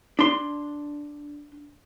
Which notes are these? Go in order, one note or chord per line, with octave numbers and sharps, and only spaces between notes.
D4 C6